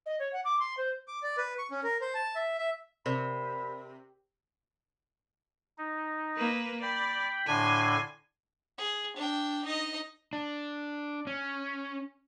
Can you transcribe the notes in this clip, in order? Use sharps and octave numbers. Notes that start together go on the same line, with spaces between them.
D#5
C#5
F#5
D6
C6
C5
D6
D5
B4
C#6
C#4
A#4
C5
A5
E5
E5
C3 A#4 C5 D5 B5
D#4
A#3 B4
D5 G5 B5
A2 D3 D4 G#5 C6
G#4
D4 G5
D#4 D#5
D4
C#4